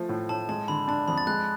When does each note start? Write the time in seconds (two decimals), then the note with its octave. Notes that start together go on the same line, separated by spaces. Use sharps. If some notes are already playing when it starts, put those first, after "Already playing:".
Already playing: F3 A3
0.09 A2
0.29 A2 A5
0.49 G#3 A5
0.68 D3 B5
0.88 D4 A5
1.08 F2 B5
1.18 A6
1.27 G#3 F#6